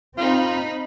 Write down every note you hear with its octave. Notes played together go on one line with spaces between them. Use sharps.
C4 D#4 F4 B5